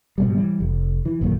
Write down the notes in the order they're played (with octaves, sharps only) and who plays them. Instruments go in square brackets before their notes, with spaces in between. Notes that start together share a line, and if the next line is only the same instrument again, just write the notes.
[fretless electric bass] G#2 B2 G3
E3 G3
F1
E3
A1 F#2 A#2 D#3